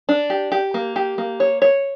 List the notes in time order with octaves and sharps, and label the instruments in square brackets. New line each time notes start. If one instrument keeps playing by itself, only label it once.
[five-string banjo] D4
G4
G4
A#3
G4
A#3
C#5
C#5